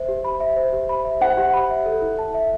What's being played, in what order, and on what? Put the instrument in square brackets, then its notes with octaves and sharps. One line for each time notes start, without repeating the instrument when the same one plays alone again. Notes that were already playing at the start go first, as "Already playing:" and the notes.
Already playing: [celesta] C5 E5
G4
B5
E5
C5
G4
B5
E5
[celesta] C5 [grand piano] F#5
[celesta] G4
B5
E5
A4
E4
A5
E5